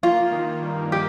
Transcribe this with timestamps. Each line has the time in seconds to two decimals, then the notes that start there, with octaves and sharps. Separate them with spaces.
0.03 A#3 F4
0.32 D#3
0.62 G2
0.92 A#3 G4